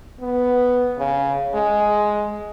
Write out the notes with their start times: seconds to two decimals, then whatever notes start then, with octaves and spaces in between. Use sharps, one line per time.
0.21 B3
0.98 C#3
1.54 G#3